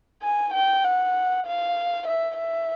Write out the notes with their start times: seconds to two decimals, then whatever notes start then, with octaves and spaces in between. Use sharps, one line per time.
0.22 G#5
0.54 G5
0.85 F#5
1.46 F5
2.07 E5
2.39 E5